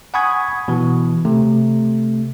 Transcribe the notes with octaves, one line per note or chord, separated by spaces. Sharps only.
F#5 G#5 B5 C#6 D#6 G#6
B2 E3
C3 A3